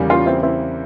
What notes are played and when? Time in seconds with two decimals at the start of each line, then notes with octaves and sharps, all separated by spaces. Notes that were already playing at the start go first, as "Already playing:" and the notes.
Already playing: E2 C#3 G3 A#3
0.09 C#4 F4
0.26 C4 E4
0.43 C4 E4